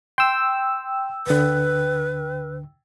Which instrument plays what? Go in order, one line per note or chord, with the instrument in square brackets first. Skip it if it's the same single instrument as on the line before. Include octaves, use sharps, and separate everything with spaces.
[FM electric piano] G5 E6 [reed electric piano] C6
[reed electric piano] D2 D3 [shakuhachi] B4